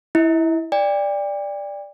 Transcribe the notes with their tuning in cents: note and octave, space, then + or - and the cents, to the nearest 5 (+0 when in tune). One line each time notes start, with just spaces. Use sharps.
E4 -5 D#5 +45
D5 +0 G5 +35